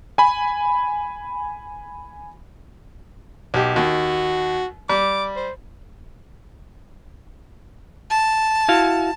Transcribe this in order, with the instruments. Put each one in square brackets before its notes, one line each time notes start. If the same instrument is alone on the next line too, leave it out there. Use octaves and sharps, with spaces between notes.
[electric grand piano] G#5 B5
[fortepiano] B1 G4
[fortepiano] D#2 [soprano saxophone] F#4
[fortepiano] G3 [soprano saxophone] D6
[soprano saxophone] C5
[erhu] A5
[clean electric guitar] E4 F#4 F5